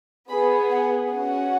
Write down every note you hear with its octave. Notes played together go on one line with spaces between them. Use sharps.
B3 G#4 B5
F#5
C#4 F#4 F#5